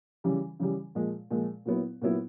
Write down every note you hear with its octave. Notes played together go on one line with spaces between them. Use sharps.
C#3 E3 G3
C#3 E3 G3
A#2 F3 G#3
A#2 F3 G#3
A#2 F#3 B3 E4
A#2 F#3 B3 E4